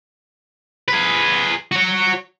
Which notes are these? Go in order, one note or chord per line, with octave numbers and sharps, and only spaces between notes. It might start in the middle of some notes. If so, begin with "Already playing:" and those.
G#4 B4
F#4 C#5